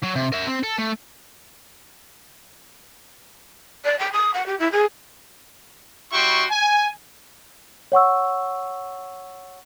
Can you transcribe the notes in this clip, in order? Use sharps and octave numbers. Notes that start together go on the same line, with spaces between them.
F#3
C3
A#4 E5
C4
A4
A3
D5
G5
D#6
F#5
G4
E4
G#4
G3 E4 F#4 G5 C6 C#6
G#5
C#5 F#5 C#6 E6